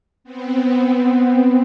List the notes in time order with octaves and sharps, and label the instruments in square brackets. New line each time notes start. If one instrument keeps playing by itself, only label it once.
[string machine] B3 C4